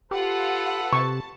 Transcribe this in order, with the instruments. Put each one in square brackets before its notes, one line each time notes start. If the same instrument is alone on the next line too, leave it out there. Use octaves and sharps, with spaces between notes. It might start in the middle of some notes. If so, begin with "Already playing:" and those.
[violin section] F4 F#5 [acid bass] G4 [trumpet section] A4 B4
[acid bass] C3 [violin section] A5 [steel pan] C#6